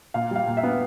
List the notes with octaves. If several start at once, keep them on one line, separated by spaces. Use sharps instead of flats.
A#2 F5
G3 F5
A#2
E5
B3